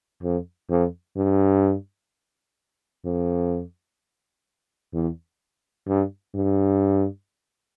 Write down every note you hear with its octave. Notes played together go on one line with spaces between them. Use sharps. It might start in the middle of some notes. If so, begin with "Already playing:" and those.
F2
F2
G2
F2
E2
G2
G2